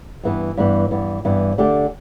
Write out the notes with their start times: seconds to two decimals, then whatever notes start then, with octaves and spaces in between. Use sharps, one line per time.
0.23 G2 E3 B3
0.57 G2 E3 B3
0.91 G2 E3 B3
1.25 G2 E3 B3
1.58 D3 A3 G4